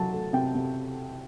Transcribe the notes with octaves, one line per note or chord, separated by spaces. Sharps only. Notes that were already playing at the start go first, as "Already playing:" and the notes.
Already playing: F#3 A3 A5
A3
C3 G5
C3